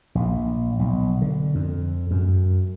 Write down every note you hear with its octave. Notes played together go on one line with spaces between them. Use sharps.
A#1
B1
D3
F2
F#2